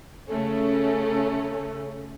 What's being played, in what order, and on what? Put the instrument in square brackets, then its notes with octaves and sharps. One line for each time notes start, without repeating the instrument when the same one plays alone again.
[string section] C#3 A3 C#4 [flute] A4